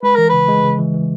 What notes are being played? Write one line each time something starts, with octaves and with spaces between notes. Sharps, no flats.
G#3 B4
E3 A#4
C#3 B4
G#3
C#3
E3
E3